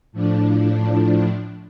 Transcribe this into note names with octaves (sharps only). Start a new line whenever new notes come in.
A2 F3 D4